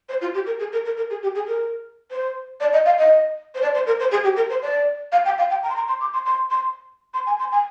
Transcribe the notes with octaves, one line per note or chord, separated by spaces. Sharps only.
C5
F4
G4
A#4
G#4
A#4
A#4
A#4
G#4
G4
G#4
A#4
C5
D5
D#5
F5
D#5
C5
D5
C5
A#4
C5
G#4
G4
A#4
C5
D5
F5
G5
F5
G5
A#5
C6
A#5
C6
D6
C6
C6
C6
C6
G#5
C6
G#5